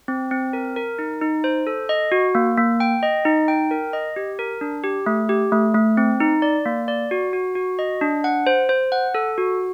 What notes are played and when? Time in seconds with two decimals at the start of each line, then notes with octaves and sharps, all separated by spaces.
0.08 C4
0.31 C4
0.53 A#4
0.76 A#4
0.99 D#4
1.21 D#4
1.44 C5
1.67 A4
1.89 D#5
2.12 F#4
2.35 A#3
2.57 A#3
2.80 G5
3.03 D#5
3.25 D#4
3.48 G5
3.71 A#4
3.93 D#5
4.16 G4
4.39 A#4
4.61 D4
4.84 G4
5.06 A3
5.29 G4
5.52 A3
5.74 A3
5.97 C4
6.20 D#4
6.42 D5
6.66 A#3
6.88 D5
7.11 F#4
7.33 F#4
7.55 F#4
7.79 D#5
8.01 D4
8.24 F#5
8.47 C5
8.69 C5
8.92 F#5
9.15 A4
9.38 F#4